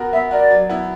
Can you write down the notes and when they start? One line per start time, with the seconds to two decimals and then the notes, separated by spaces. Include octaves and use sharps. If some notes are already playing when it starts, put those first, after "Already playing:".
Already playing: B3 F#4 A#4
0.12 B3 E5
0.31 F#4 A#4 D5
0.51 F#3
0.69 B3 E4